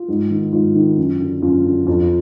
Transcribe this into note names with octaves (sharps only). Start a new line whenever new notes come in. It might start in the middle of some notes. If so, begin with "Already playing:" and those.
Already playing: F4
G#2
D#3
G#2 F4
D#3
F#2
D3
F#2 F4
D3
F2 F4